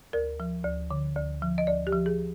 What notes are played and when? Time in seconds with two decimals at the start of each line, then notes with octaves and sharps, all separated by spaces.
0.13 D2 A#4
0.40 F3
0.64 D2
0.91 D3
1.16 D2
1.42 F3
1.58 D#5
1.67 D2 D5
1.87 G4
1.93 F3
2.06 G#4